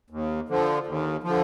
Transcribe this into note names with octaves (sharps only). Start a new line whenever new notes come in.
D#2
D3 F3
D#2
D3 F3